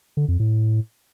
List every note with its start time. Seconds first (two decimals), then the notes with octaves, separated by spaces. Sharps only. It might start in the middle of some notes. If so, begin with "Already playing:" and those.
0.17 D3
0.28 F2
0.40 A2